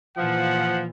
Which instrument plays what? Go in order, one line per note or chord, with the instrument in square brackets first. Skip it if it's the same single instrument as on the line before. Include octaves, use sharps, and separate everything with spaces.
[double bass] A#2 E3 [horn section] F3 [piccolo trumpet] F#5